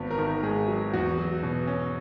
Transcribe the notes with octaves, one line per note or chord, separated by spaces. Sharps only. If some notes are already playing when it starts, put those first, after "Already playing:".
Already playing: G#1 B3
A#4
D#3
A#4
G#2 G#4
F#3
E2 F#4
F#3
B2
C#4